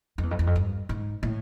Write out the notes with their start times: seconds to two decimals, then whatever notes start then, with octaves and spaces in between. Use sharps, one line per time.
0.18 F2
0.23 E2
0.31 F2
0.39 E2
0.47 F2
0.56 G2
0.89 G#2
1.23 A2